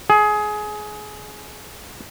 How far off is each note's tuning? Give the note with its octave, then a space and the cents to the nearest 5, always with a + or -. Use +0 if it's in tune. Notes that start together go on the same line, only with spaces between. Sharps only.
G#4 +20